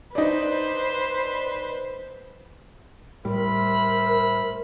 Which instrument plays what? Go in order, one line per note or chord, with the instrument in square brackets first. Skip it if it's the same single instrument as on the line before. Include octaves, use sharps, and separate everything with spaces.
[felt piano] D#4 D5 [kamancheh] B4 C5
[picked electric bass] A2 G3 [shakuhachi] A#4 [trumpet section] C5 E5 B5